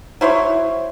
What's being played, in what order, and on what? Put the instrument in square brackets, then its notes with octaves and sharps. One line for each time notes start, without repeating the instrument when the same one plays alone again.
[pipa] F#3 E4 C5 C#5